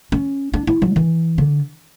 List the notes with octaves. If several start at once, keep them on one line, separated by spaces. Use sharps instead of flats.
C#4
D4
E4
F#3
E3
D3